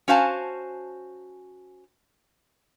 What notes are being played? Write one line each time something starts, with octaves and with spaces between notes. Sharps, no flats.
C#4 F#4 C5 F5 G#5 A5